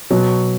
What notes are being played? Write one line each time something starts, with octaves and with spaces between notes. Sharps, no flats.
B2 F#3